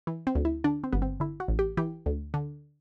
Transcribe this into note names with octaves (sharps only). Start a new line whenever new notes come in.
E3
C4
D2
E4
D3 D4
C4
G1 B3
C4
D3 E4
F#4
A1
G4
E3 G4
D2
D3